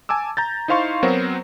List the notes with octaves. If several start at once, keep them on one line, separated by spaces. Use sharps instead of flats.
G#5 A5 D6 E6
A#5 G6 A6
D#4 E4 C5 F5 C6 C#6
F#3 B3 C4 F#4 A#4 C5